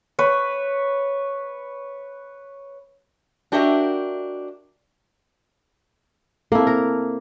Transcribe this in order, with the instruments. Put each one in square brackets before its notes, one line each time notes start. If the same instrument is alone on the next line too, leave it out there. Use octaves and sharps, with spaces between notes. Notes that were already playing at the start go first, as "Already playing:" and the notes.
[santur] B4 C#5
[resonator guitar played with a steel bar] D4 F#4 G4 A#4 D#5 E5
[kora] A#3 E4 [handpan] C4 A4
[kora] A#4